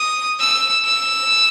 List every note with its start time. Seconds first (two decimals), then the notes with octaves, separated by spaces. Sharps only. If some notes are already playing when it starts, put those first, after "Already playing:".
Already playing: D#6
0.40 E6
0.85 E6